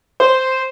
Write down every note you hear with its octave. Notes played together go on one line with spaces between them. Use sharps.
C5